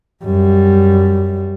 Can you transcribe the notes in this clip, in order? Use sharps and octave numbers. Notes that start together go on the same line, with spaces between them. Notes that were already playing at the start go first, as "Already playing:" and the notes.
F#2 G3